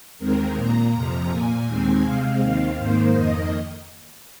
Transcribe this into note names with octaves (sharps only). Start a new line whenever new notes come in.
D#2 D#3 G#3 C4 A#4
A#2 A#3 A#5
F2 C3 F3
A#2 A#3 G#5
D#2 D#3 G#3 C4 G#5
C3 G#3 C4 F5
D#2 D#3 C4 F5
G#2 D#3 A#3 C5
F2 D#3 A#3 D#5